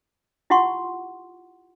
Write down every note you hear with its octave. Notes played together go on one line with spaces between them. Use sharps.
E4 F4 G4 F#5 C6 C#6